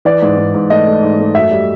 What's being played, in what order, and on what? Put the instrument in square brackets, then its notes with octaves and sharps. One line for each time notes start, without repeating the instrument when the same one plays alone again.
[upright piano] E3 D5
G#2
G#2
G#2
A3 D#5
A3
G#2
A3
F#2 E5
G3